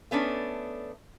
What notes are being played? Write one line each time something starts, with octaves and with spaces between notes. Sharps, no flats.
A3 B3 C#4 D4